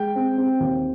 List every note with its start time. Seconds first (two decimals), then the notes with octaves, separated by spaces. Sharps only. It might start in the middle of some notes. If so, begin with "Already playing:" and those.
Already playing: G#3 G5
0.16 C4
0.38 C4
0.60 D#2